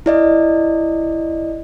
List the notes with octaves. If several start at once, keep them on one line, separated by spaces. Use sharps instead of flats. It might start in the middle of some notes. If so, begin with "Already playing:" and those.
E4 D5 D#5